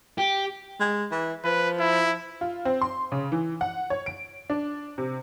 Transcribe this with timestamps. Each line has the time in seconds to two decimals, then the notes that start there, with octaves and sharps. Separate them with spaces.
0.18 G4
0.80 G#3
1.11 E3
1.44 F3 B4
1.80 E4
2.41 F4
2.65 C4
2.81 C6
3.12 C#3
3.32 E3
3.61 F#5
3.90 C#5
4.06 D7
4.50 D4
4.98 C3